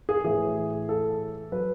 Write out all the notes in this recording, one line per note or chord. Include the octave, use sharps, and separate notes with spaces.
G#4
A2 E3 G#4
A4
F#3 B4